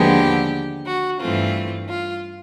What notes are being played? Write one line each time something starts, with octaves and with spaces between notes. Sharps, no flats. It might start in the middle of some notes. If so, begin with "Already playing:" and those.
Already playing: D#2 D3 F3 G#3 B3 G4
F#4
G2 E3 A3 C4 F4
F4